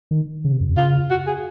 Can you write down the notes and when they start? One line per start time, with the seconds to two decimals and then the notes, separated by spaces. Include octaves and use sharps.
0.11 D#3
0.45 C#3
0.52 C3
0.60 F#2
0.69 F2
0.77 C#3 F4
1.11 F#4
1.27 G#4